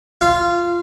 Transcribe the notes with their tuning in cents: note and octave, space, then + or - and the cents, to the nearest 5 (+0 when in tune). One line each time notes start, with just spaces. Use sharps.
F4 -10 F5 -25